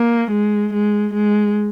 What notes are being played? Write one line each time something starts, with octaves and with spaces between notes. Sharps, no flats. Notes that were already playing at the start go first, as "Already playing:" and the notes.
Already playing: A#3
G#3
G#3
G#3